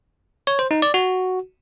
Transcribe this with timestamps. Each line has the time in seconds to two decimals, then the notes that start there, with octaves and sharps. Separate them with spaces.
0.47 C#5
0.59 C5
0.71 D#4
0.82 D5
0.94 F#4